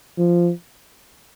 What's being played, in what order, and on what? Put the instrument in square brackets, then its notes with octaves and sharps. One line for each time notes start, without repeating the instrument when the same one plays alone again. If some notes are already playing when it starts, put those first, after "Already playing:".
[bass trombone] F3